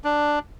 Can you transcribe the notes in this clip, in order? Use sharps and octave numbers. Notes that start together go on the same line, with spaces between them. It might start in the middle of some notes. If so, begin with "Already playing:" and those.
D4